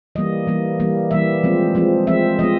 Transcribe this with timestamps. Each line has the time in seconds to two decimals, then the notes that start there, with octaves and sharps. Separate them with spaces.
0.15 E3 G3 A#3 D#5
0.47 E3 G3 A#3
0.79 E3 G3 A#3
1.11 E3 G3 A#3 E5
1.43 F3 G#3 C4
1.75 F3 G#3 C4
2.07 F3 G#3 C4 E5
2.39 F3 G#3 C4 D#5